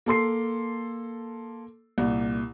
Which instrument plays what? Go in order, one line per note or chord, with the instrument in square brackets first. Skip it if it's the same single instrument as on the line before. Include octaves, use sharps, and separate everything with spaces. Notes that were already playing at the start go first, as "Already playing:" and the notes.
[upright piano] A#3 A4 C6 C7
C2 A#2